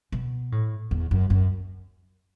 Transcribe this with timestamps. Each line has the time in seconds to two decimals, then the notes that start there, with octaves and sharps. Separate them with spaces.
0.12 B2
0.52 A2
0.91 E2
1.11 F#2
1.30 F#2